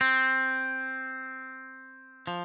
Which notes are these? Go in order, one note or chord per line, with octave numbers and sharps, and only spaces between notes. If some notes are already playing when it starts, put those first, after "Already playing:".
C4
F3